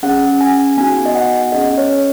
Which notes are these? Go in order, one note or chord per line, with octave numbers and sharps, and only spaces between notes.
C#4 G#4 F#5
G#5
B3 D#4 F#4 G#5
D#5
F#5
C#4 G#4 D#5
C#5